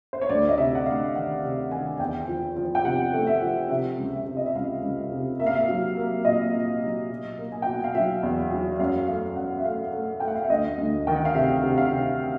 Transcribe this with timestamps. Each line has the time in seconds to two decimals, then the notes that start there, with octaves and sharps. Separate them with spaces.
0.13 C5
0.21 C#5
0.29 D2 D5
0.49 D#5
0.58 C3 E5
0.75 F#5
0.86 D2 F5
1.15 D#3 F#5
1.43 C3
1.71 D#3 G#5
1.99 E2 G5
2.28 F3
2.57 F3
2.75 G5
2.84 C3 F#5
3.13 A3
3.27 E5
3.42 F3
3.70 C3 E5
3.98 C#2
4.12 E5
4.26 C3
4.37 D#5
4.46 E5
4.55 C#2 F5
4.83 C#2
5.12 C3
5.39 A#3 E5
5.47 F5
5.54 E5
5.68 F#3
5.97 A#3
6.25 A#2 D#5
6.53 F#3
6.82 F#3
7.10 B2
7.38 A#3
7.52 G#5
7.62 B2 G5
7.73 F#5
7.84 F5
7.95 F#3 E5
8.23 E2
8.51 F#3
8.79 F#2 F5
9.08 A3 F5
9.36 F#2 F#5
9.58 E5
9.64 A3 F5
9.93 A3
10.20 A3 G5
10.28 F#5
10.35 F5
10.43 E5
10.50 D2 D#5
10.78 D2
11.07 D#3 G5
11.16 F#5
11.25 F5
11.35 C3 E5
11.63 C3
11.78 F5
11.92 C3